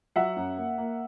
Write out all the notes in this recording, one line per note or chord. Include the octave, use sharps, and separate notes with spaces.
F#3 E5 F#5
F#2
A#3
A#3